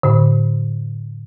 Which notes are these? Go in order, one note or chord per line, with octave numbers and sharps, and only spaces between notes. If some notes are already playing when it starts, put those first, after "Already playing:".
A2 D3